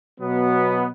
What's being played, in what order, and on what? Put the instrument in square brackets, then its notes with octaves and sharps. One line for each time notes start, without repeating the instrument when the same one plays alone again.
[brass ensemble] B2 F#3 B3